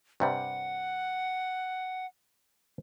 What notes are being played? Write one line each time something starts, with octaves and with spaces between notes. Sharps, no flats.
G2 C3 G3 F#5